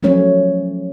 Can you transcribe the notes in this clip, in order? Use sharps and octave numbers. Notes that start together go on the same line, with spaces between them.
F3 F#3 A3 C#4 C#5